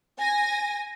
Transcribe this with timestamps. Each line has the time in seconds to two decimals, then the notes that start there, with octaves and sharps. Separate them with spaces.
0.18 G#5 A#6